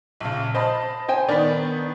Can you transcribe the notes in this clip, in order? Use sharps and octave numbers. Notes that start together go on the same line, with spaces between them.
A#1 C#3
C5 D#5 A5 B5
C5 G5 G#5
D#3 B3 D4 A#4 D5